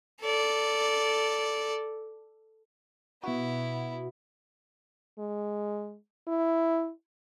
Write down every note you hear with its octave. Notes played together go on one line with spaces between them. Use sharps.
A4 D5
B2 B3 E4 F#4
G#3
E4